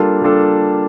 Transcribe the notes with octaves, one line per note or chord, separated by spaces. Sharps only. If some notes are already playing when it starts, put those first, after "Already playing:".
Already playing: G3 A#3 D4 F4 A4
G3 A#3 D4 F4 A4